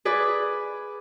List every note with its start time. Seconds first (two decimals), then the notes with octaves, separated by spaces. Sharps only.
0.05 G#4 B4 D5